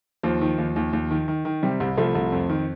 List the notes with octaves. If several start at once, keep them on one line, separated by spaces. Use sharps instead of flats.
D#2 F3
D#3
D#2
D#2
D#2
D#3
D#3
D#3
C3 G3
C2
C2 F3 A3
C2
F2
D#3